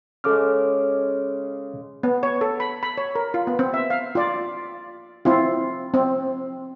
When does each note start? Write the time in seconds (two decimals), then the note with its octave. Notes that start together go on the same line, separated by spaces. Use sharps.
0.24 C#3 G#3 A4 D6 F6
2.03 B3
2.23 C#5
2.41 A4
2.60 B5
2.83 B5
2.98 C#5
3.15 A#4
3.34 F4
3.47 B3
3.59 C4
3.74 E5
3.90 F5
4.15 F4 D5
5.25 C4 E4 F4
5.94 C4